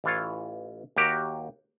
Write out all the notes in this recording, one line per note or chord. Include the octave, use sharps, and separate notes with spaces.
A1 E3 F4 C#5
D#2 F#4 G4 A#4